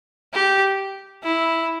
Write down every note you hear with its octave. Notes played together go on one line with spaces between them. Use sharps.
G4
E4